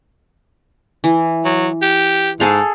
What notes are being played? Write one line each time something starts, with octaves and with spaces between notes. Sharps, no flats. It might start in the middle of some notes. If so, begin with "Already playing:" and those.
E3
F#3
G4
G#2 G#4 A4 F5